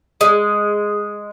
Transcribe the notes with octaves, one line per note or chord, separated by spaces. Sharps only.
G#3